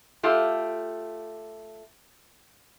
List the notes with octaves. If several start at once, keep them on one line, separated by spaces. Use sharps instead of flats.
A3 F4 G4